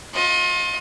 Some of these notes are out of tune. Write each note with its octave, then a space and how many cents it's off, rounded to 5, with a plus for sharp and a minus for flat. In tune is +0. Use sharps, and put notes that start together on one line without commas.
F4 +35 D#5 +25